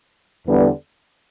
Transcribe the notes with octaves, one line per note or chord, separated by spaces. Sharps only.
E2 D3 G3 B3